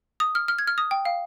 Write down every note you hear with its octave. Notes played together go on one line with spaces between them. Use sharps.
D#6
F6
F6
G#6
F6
D#6
G5
F5